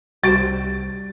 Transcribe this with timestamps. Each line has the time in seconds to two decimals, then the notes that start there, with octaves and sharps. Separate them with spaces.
0.23 C2 G3 F#4 G4 C5 A6 D7